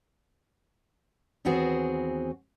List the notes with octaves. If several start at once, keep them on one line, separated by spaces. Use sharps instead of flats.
D#2 E3 B3 C4 F#4 G#4